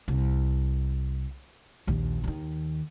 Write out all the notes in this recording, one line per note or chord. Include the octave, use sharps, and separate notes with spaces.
C2
A#1 D#2
D#2 D#3